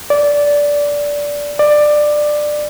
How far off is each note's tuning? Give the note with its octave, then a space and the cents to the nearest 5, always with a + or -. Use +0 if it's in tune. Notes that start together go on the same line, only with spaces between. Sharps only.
D5 -15
D5 +15